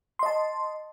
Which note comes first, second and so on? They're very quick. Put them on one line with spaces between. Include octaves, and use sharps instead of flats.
C6 D#5 A5